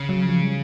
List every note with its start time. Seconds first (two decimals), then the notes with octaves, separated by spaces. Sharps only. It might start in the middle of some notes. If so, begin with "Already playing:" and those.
Already playing: C#3
0.09 F#3
0.26 F3
0.41 G3